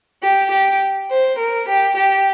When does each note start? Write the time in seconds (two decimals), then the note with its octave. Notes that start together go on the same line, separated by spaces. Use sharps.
0.24 G4
0.52 G4
1.10 C5
1.39 A#4
1.67 G4
1.96 G4